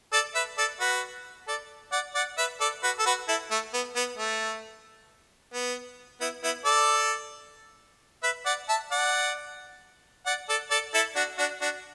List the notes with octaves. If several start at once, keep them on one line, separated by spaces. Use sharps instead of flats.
A4 D5
B4 E5
A4 D5
F#4 B4
A4 D5
D5 F#5
D5 F#5
B4 E5
A4 D5
F#4 B4
A4
F#4 B4
E4 A4
A3
B3
B3
A3
B3
B3 E4
B3 E4
A4 D5
B4 E5
D5 F#5
E5 A5
D5 F#5
D5 F#5
A4 D5
A4 D5
E4 A4
D4 F#4
D4 F#4
D4 F#4